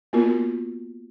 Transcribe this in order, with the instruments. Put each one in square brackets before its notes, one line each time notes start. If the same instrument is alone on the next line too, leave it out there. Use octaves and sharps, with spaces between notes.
[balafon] A#3 B3 F4 F#4 A#4